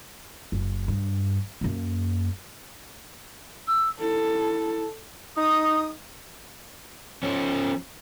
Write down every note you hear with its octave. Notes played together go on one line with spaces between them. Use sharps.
F#1
G2
F#2 A#3
E6
E4 A4
D#4 D#6
F3 C#4